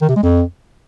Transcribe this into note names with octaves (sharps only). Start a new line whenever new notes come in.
D#3
C3
G#3
F2